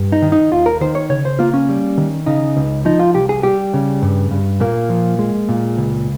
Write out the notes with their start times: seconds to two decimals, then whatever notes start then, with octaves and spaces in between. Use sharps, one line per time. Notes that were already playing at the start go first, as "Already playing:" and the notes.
Already playing: G2
0.12 D#4
0.22 D#3
0.32 D#4
0.51 D#2 F4
0.66 A#4
0.81 D#3 C5
0.95 C#5
1.10 C#3 C#5
1.25 C5
1.39 A#3 F4
1.54 C#4
1.69 G3
1.98 D#3
2.26 C#3 D#4
2.57 C#2
2.85 F3 D#4
2.99 F4
3.15 C2 G4
3.29 G#4
3.43 G3 G4
3.74 C#3
4.02 G2
4.31 G2
4.60 A#2 A#3
4.90 F3
5.19 G#3
5.49 A#2
5.77 C#2